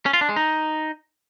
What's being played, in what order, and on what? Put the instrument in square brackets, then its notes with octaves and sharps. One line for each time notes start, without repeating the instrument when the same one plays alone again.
[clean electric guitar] C#4
F4
D4
G#3
D#4